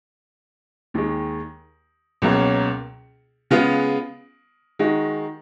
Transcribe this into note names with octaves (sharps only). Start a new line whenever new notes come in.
D#2 D#3 G#3
C#2 B2 F#3 A#3 C#4
C#3 G#3 B3 F4
D#3 G#3 D#4 F#4